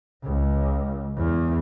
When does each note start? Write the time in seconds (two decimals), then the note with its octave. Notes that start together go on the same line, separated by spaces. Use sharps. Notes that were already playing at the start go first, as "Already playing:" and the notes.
0.24 C#2
1.17 E2